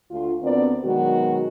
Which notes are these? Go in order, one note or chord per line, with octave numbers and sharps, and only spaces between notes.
D2 F4
D2 B3 C4 A#4 D5
B2 D#3 F#3 G#3 F#4